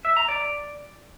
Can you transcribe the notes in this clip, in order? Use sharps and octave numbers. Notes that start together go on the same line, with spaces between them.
E5
A#5
D5